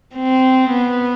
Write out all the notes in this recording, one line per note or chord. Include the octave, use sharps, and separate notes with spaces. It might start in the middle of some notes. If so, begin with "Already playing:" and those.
C4
B3